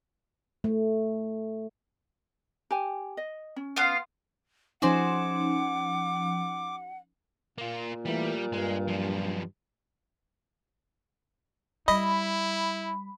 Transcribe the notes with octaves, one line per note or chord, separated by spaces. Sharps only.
A3
G4 G#5
D#5
C#4
B3 F4 F5
F3 C#4 D#4 F#4 G#4 C5 F#5 D6
A#2 A#3 F4
E3 G3 A3 A#3
G2 G#3
F#2 F3
G3 E4 D#5 B5